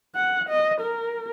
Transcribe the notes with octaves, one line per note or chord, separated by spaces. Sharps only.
F#5
D#5
A#4